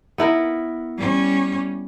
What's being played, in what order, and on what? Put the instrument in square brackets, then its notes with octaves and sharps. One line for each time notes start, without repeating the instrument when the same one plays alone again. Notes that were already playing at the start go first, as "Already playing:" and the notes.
[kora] B3 E4 A#4
[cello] G3 C#4